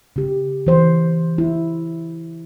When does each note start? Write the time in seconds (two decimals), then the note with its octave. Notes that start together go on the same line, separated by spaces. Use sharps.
0.16 C#3 G4
0.67 E3 C5
1.38 E4